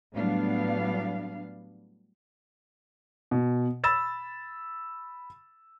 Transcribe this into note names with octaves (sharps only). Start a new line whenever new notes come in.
A2 F#3 G3 B3 D4 F5
B2
B5 E6 A6 E7